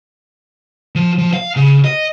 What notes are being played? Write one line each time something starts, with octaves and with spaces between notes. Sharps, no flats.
F3
F3
F5
C#3
D#5